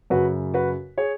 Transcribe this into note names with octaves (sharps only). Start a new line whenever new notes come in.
F#2 C#3 F#4 B4
F#4 B4
G#4 C#5